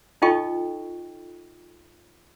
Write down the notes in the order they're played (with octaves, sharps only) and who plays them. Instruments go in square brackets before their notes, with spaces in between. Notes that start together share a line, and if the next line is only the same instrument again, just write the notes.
[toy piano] D#4 F4 A4 D#5 G5 C#6